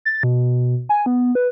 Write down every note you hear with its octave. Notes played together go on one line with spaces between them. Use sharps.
A6
B2
G#5
B3
B4